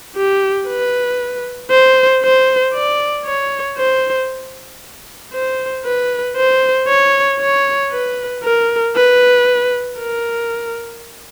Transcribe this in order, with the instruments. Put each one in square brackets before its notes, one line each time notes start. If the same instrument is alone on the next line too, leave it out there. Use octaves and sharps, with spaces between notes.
[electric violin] G4
B4
C5
C5
D5
C#5
C5
C5
B4
C5
C#5
C#5
B4
A#4
B4
A#4